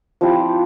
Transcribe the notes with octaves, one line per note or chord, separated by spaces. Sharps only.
F3 C4 E4 G4